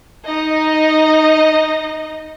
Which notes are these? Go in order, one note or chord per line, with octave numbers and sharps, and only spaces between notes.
D#4 D#5